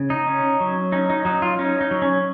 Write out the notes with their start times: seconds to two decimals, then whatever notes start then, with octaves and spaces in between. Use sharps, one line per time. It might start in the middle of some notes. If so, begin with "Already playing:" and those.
Already playing: C#3
0.10 D#4
0.27 C#4
0.60 F#3
0.92 C#4 D#4
1.10 D#4
1.25 F#3 D#4
1.42 F4
1.59 C#4 D#4
1.81 D#4
1.91 F#3
2.02 C#4